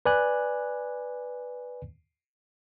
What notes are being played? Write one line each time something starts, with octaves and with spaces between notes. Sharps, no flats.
B4 D5 G#5 F#6